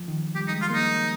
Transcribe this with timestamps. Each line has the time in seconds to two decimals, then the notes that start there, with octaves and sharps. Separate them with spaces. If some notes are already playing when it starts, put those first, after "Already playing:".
Already playing: F3
0.08 D#3
0.35 G3 G4
0.48 D#4
0.53 G#3
0.62 F4
0.70 A#3 D#4